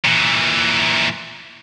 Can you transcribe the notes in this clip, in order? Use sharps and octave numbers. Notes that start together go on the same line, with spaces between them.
A#2 E3